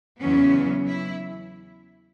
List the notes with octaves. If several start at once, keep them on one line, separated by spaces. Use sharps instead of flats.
E2 C#3 F#3 B3 C#4
E4